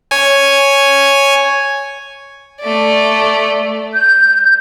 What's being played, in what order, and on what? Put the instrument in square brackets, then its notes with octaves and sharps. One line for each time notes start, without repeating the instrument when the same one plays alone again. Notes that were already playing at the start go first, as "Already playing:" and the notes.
[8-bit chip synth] C#5 G#5
[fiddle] A3 D5
[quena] G6